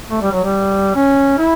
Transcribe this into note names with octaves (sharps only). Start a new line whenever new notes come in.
A3
G3
F#3
G3
C#4
E4